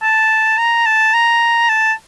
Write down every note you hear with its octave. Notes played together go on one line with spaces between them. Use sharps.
A5
A#5
A5
A#5
A5